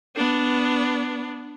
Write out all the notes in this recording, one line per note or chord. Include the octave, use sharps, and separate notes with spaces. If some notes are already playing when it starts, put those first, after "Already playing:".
B3 D4